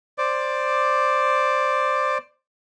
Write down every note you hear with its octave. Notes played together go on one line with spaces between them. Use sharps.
C5 D5 D6